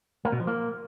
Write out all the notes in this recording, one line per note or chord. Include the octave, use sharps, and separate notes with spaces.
A#3
B2
F3
A#3